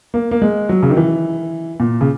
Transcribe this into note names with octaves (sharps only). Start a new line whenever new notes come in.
A#3
A#3
G#3
F#3
C#3
D#3
E3
A#2
C#3